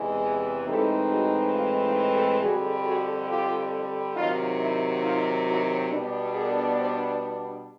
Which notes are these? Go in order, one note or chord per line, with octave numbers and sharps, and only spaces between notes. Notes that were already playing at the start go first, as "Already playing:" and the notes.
Already playing: E2 C3 E3 G#3
A2 E3 G#3 C4 D#4 G4 A4
F#4 G#4
D#4 F4
D#4 F4
G4 A4
F2 D3 G3 F#4 G#4
F#4 G#4
F4 G4
C3 D#3 F#3 D#4 F4
E4
D#4 F4
E4 F#4
B2 G3 B3 D4
G#4 A#4
C5 D5